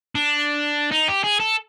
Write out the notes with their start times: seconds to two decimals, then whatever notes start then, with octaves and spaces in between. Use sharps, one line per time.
0.15 D4
0.91 D#4
1.08 G4
1.23 G#4
1.39 A4